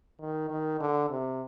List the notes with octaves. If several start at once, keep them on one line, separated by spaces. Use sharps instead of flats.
D#3
D#3
D3
C3